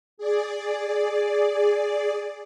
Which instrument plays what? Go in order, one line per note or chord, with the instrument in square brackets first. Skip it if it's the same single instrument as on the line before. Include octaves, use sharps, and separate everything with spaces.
[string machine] G#4 D5